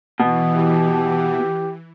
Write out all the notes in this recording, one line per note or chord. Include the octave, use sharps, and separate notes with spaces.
B2 E3
G4